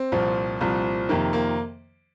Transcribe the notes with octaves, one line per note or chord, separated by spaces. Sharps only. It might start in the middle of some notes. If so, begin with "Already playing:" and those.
Already playing: C4
C2 A#2 F3
C2 A#2 F3
F2 C3 D#3 A#3
A#3